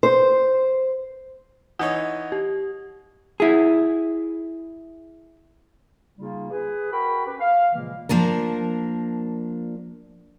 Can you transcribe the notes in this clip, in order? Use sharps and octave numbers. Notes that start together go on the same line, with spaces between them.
C5
E3 D#4 C#5 F#5 D#6
G4
E4 G#4
C#3 G3 A#3 D#4 F4
G#4 B4
F#4 A#4 G5 B5
C#4 G4 B4
F5
A#2 C#3 E3 F3 G#3 A#3
F3 A#3 D4 A#4